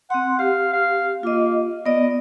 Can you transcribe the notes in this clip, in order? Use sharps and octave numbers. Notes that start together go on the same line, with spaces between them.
C4 F#5 C6
G4 F5
F5
A#3 F4 D#5
B3 D5 D#5